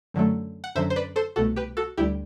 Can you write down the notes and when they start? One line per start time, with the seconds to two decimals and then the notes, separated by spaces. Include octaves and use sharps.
0.14 F#2 D3 F#3 A3
0.64 F#5
0.75 F#2 D3 F#3 C5 E5
0.90 C5
0.96 B4 D5
1.16 A4 C5
1.36 C2 B2 A3 F#4 A4
1.56 G4 B4
1.77 F#4 A4
1.97 D2 D3 G3 E4 G4